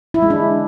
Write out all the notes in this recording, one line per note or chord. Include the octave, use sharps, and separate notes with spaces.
E4
G#3
D4